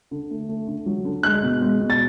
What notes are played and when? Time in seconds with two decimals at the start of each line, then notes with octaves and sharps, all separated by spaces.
0.11 D3
0.30 A3
0.49 A3
0.67 D3
0.86 F#3
1.05 D3
1.23 G#3 F#6
1.43 B2
1.62 G#3
1.80 B2
1.90 A6